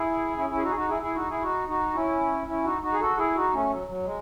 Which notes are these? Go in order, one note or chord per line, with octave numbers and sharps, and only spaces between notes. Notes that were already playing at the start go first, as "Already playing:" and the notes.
Already playing: E4 G#4
C#4 E4
C#4 E4
G#4
D#4 F#4
G#4
D#4 F#4
E4 G#4
E4 G#4
D#4 F#4
E4 G#4
D#4 F#4
D#4 F#4
C#4 E4
C#4 E4
D#4 F#4
D#4 F#4
G#4
F#4 A4
E4 G#4
D#4 F#4
A3 C#4
F#3
F#3
G#3